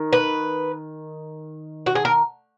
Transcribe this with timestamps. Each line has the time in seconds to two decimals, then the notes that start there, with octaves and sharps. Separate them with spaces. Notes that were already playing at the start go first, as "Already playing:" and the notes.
Already playing: D#3
0.13 B4
1.86 F#4
1.95 G#4
2.05 A#4